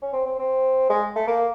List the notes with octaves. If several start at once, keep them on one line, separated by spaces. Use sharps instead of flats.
C#4
C4
C4
C4
G#3
A3
A#3